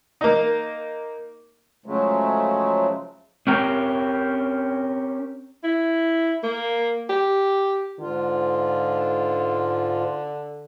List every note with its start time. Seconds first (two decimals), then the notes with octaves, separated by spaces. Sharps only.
0.21 A#3 D#4
1.86 C#3 F3 F#3 G#3 A3
3.47 C4 C#4 G4 A#4
5.64 E4
6.44 A#3
7.09 G4
7.99 G#2 D3 F4